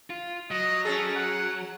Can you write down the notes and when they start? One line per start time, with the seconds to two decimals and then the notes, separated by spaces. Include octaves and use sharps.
0.10 F4
0.51 F#3 D#5
0.85 C#4 G#4 A4
1.16 F#5